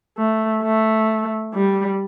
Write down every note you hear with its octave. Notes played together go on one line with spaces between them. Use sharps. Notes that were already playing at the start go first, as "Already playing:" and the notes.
A3
A3
G3